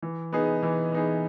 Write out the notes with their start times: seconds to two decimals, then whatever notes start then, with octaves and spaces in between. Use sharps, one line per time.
0.02 E3
0.33 B3 D#4 G#4
0.63 E3
0.92 B3 D#4 G#4